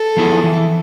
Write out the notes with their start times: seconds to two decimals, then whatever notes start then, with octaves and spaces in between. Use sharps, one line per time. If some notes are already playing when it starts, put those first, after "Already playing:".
Already playing: A4
0.17 F3 B3 E4 G#4
0.44 E3